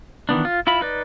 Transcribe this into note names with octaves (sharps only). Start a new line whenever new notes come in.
D#3 E3 B3 D4
F4
E4 F4 E5 B5
D#4 B4 D5